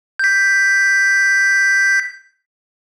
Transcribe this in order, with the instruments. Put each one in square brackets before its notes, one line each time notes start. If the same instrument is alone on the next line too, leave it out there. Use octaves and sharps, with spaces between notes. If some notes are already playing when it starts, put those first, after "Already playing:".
[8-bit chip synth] G6 B6